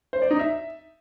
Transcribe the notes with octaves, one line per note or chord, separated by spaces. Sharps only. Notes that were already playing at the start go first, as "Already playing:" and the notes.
C5
D5
D#4
E5